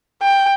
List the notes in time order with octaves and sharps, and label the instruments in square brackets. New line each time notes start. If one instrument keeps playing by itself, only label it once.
[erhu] G5